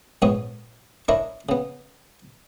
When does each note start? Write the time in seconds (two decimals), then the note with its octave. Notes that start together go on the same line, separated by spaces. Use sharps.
0.22 A#1 G#2 B3 C#5 D#6
1.08 D4 E4 A#4 C#5 D#5
1.49 C#3 B3